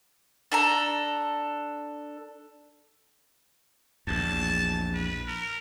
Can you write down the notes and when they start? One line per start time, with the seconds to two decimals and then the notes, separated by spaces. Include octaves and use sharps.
0.52 D4 A4 A#5
4.07 A#1 E2 A5
4.94 B4
5.27 A#4